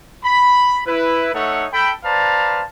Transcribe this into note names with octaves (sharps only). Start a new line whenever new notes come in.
B5
E4 B4
A3 D#4 A4 C#5 E5 F#5
A4 G5 B5
B4 C5 D5 F5 A5 A#5